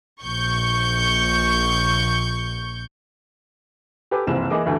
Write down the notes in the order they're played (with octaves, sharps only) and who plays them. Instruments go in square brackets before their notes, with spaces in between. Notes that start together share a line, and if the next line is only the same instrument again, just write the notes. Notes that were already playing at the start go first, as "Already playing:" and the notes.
[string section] A#1 C#6 G6
[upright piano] G4 A4 B4 G#5 D6
F#1 C2 E3 F3 C4 E7
E3 A#3 G#4 D#5 D6
D2 G2 E3 A3